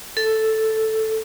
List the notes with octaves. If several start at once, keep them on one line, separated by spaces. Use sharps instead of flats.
A4